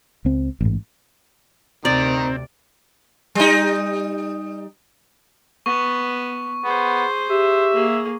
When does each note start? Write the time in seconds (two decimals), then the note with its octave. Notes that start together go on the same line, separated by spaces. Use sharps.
0.25 C#2 C4
0.61 A1 G#2
1.85 D2 C3 D#3 C4 D5 A#5
3.35 G3 D#4
5.66 B3 C#6
6.64 B3 G#4 C5
7.31 G4 E5
7.71 A#3 G#4